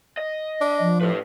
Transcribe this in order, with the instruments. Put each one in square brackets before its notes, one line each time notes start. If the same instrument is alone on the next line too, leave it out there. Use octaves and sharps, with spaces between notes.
[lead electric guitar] D#5
[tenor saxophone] D4
[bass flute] F3
[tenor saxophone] A2 [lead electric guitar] G4 B4